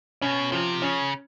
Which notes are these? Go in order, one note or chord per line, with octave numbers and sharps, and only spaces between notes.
B2 C#4
C3 F3
C#3 C#4